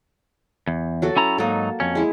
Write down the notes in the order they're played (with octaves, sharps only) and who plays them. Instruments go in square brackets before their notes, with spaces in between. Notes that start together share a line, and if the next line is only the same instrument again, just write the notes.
[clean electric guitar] E2
[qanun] F#3 F#4 A4
[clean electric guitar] C#4 E4 A#5
[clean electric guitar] G#2 F#3 D#4 [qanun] A#3 A4
[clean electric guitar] F2 C#4
[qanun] G#3 E4